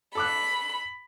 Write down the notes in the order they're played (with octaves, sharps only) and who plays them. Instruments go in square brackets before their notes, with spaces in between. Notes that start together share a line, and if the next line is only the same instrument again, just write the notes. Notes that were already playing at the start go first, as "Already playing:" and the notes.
[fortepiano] A4 D6 F#6 [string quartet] B5